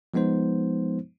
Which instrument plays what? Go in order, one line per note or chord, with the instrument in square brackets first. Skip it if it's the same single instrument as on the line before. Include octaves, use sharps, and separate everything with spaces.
[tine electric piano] F3 G#3 B3 D#4 C5